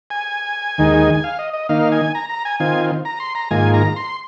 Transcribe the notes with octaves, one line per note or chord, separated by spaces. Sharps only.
G#5
D#2 D#3 G#3 D#4
G#5
F5
D#5
D#5
D#3 A#3 D#4 F5
G#5
A#5
A#5
G#5
D#3 C4 F4 G#5
A#5
C6
A#5
G#2 D#3 A#3 F4 G#5
A#5
C6